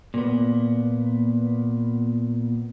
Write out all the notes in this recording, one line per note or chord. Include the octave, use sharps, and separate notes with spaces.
A#2 B3